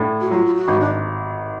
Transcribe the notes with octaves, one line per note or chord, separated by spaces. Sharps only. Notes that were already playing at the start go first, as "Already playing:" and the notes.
Already playing: A2 D4
F#4
F#3 F4
F4
F#4
G#1
D4